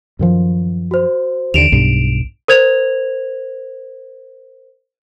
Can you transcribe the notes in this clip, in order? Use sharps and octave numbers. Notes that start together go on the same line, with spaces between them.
F#2 D#3 F3
F#4 C5
D#2 D3 D7 E7 F7
B1 G2
A#4 C5 G#6 F7